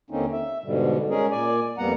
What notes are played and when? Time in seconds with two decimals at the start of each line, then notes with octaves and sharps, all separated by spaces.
0.10 D#2 D3 A#3 C4 C#4 D#4
0.32 E5
0.64 G#2 B2 D3 G3
1.10 G#3 C#4 G#4 A#4
1.31 A#2 D5 G#5
1.78 F2 G3 A#3 B3 F#5 A#5